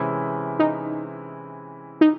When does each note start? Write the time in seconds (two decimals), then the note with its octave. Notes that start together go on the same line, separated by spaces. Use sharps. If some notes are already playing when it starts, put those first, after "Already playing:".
Already playing: C3 E3 G#3 C#4 E4
0.59 D#4
2.01 D#4